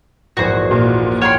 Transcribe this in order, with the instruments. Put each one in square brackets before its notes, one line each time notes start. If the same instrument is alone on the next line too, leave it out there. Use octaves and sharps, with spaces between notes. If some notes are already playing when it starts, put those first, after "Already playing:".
[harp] A#1 E2 G#2 [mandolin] F#4 C5
[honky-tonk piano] A#2
[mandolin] C#5 G5 C6 [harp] F#5 [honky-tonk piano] F6